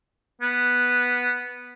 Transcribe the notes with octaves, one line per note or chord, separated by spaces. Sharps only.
B3